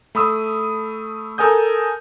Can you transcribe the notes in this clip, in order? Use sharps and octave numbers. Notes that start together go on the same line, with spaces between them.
A3 B5 D#6 E6
A4 A#4 G#5 D#6 G6